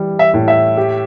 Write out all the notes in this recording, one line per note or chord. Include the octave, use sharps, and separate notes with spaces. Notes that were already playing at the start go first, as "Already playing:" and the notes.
Already playing: E3 G3
E5
A2
E5
G4